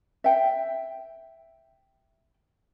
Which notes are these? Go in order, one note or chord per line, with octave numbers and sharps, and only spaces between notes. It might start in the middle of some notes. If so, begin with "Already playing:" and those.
E5 G5